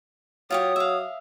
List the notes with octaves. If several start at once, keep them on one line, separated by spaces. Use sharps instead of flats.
F#3 F4 G4 C#5 D#6
E5 F5